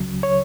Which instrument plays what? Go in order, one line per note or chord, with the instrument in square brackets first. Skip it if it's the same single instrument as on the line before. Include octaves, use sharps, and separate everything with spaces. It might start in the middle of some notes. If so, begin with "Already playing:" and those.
Already playing: [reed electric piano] C#2 C#3 F#3
C#5